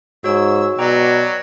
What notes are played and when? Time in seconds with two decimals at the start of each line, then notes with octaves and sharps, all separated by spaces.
0.24 G#2 F#4 C#5 E6
0.79 B2 F#3 D5 G5 A#5 D6